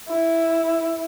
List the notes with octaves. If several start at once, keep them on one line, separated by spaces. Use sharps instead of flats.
E4